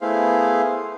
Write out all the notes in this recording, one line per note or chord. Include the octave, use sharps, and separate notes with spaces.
A3 B3 E4 G#4 C5 F5